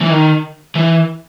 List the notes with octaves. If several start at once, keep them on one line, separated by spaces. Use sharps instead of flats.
E3
D#3
E3